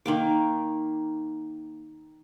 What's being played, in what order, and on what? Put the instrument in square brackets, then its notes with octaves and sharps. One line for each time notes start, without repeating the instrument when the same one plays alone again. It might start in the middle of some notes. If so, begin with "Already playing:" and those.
[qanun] D#3 A#3 D6